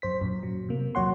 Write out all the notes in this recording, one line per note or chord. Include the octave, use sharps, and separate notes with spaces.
F#2 C5 B6
F#2 A#2
F#3
C3 A#3
E2 F#3 C#5 F#5 C6